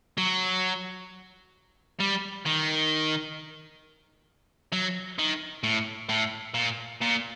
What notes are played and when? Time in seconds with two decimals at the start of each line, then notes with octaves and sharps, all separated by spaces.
0.18 F#3
2.00 G3
2.45 D#3
4.72 F#3
5.19 D#3
5.63 A2
6.09 A2
6.54 A#2
7.01 A#2